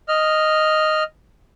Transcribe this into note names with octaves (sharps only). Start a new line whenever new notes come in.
D#5 F6